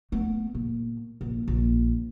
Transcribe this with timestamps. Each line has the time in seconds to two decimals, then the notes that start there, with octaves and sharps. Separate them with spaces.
0.12 A3 B3
0.55 A#2
1.21 A#1
1.48 A#1